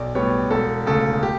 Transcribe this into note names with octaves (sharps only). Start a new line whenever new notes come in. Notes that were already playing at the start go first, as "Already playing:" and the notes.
Already playing: B1 D5
A2 G3 B3 C#5
E1 A4
D2 C#3 A4
G4